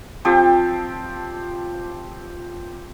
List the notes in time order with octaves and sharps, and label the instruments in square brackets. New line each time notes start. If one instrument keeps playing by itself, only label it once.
[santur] F3 C4 G4